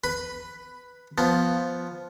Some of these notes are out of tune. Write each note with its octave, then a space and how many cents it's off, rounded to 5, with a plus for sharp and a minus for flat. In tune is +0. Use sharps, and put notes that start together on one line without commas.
B4 +0 B5 +10
F3 +0 B3 +0